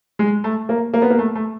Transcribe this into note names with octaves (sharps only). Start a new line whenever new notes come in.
G#3
A3
A#3
A#3
B3
A#3
A3
A3